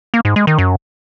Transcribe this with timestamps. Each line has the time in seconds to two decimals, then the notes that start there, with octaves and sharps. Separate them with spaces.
0.14 A#3
0.25 G#2
0.36 G#3
0.47 D#3
0.58 F#2